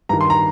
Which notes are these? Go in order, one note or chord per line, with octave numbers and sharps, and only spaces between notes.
G2 D#3 A#5
C6
A#5